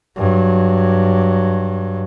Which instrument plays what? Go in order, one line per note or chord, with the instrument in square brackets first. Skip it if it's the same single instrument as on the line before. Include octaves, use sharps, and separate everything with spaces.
[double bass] G2 F#3